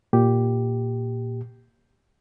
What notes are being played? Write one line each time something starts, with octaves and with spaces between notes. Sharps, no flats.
A#2 G4